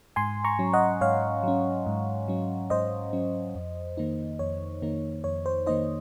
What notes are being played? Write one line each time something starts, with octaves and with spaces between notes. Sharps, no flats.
G#2 G#5 C6
A#5 C#6
F#3 C#4
D#5 F#5
G#2 C#5 F5
F#3 C#4
G#2
F#3 C#4
G#2 C5 D#5
F#3 C#4
F2
D#3 A#3 D#4
F2 C#5
D#3 A#3 D#4
F2 C#5
C5
D#3 A#3 D#4 C5 D#5